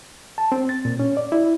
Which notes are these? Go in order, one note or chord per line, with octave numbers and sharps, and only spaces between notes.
A5
C4
A6
A#2
C#4
D5
E4